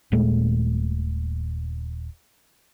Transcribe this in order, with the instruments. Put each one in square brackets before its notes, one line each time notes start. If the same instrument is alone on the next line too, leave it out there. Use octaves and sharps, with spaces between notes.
[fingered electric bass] D#1 A#2 G#3 A3